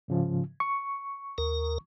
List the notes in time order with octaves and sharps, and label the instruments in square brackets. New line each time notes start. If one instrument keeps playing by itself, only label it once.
[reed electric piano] G#2 C#3 F3
C#6
[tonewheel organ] D#2 A#4